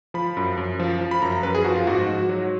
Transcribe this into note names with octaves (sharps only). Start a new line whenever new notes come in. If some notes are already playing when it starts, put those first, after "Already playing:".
F3 B5
F#2
F#2
F3
F3
B5
F#2 A#5
A#5
F#2 B4
G#4
F3 F#4
F4
G#2 F#4
G#2
F#3